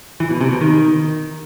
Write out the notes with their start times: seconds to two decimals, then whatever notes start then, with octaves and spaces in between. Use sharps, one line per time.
0.20 E3
0.30 B2
0.41 C3
0.51 B2
0.61 D#3